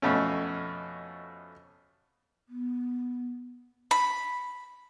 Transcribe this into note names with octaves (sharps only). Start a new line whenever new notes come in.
F2 B2 A3 C#4
B3
B5